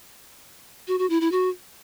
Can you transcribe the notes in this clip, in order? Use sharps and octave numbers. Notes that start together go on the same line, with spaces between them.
F#4
F#4
E4
E4
F#4